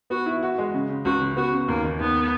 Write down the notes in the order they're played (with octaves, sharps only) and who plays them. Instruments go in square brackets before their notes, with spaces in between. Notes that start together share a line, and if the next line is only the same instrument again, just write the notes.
[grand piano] B3 [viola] F#4
[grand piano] E4
F#4
G#3
C#3
C#3
[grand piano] C#2 [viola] F#4
[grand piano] C#3
[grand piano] B3 [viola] F#4
[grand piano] C#3
[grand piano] D#2 [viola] A#3
[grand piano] D#3
[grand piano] D#2 [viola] B3